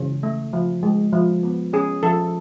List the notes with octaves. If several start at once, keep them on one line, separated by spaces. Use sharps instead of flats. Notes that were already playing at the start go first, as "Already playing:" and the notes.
Already playing: C#3 E3
A3
F3
G#3
F3
B3
C#4 G#4
F3 A4